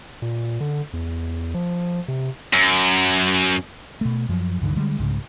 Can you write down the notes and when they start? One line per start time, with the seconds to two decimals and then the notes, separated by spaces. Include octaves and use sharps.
0.22 A#2
0.60 D3
0.93 E2
1.54 F3
2.08 C3
2.54 F#2
4.01 B2 A3
4.29 F#2 F3 F#3
4.61 C#2 G2 D3 D#3
4.76 D3 G3 G#3
4.98 C2 G#2 C#3